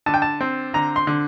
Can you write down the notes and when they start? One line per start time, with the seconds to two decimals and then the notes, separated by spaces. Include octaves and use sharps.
0.06 D3 A5
0.14 G5
0.22 A5
0.41 C4
0.74 D3 A#5
0.96 C6
1.07 D3